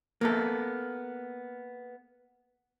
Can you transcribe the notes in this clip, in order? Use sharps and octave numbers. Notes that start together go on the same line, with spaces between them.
A#3 B3 A4